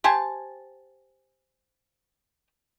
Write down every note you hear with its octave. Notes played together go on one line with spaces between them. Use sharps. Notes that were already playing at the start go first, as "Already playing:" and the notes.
G4 C5 G#5 A5